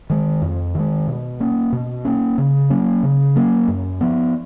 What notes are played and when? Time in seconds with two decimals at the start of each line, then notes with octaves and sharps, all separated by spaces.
0.10 D#3 G#3
0.42 F2
0.75 D#3 G#3
1.07 B2
1.40 A#3 C#4
1.72 B2
2.05 A#3 C#4
2.38 C#3
2.70 F#3 A#3 C#4
3.03 C#3
3.36 F#3 A#3 C#4
3.68 F#2
4.01 F3 B3